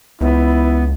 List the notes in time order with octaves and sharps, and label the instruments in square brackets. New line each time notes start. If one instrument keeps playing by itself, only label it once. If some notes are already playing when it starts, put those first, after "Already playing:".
[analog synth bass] C#2 [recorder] B3 [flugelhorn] E4